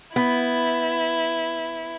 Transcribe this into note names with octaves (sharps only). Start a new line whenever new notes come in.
B3 E4